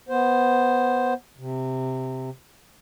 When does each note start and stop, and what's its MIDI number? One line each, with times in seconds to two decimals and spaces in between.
0.09 1.14 59
0.09 1.14 72
1.38 2.30 48